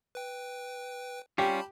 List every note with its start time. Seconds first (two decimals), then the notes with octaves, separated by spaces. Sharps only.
0.15 B4 G5
1.38 G3 C#4 F4 G4 A5 B5